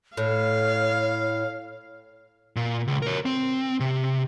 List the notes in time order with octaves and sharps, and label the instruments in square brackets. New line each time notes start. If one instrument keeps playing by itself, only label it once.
[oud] A2 [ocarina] C#5 [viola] F5
[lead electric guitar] A#2
C#2
A#4 C#5
C4
C3